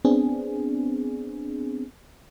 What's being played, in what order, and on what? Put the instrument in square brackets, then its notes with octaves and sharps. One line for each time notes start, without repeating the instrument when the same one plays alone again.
[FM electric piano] B3 C4 D4 G#4